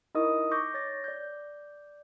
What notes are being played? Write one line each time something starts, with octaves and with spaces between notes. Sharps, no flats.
D#4 E4 A#4 D#5 C#6 D#6
C#6 D6 G6 A#6
C#5 A6 A#6
D5 G6